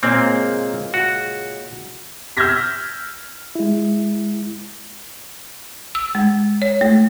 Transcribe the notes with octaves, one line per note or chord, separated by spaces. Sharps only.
A#2 C#3 G#3 A#3 C4
F#4
E6 F6 G6 G#6 A#6 B6
G#3 E4
E6
G#3
C#5
A3